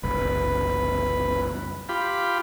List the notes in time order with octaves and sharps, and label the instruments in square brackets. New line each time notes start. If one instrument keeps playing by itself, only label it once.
[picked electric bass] F#1 C2 [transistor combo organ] B4
[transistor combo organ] F4 G4 B5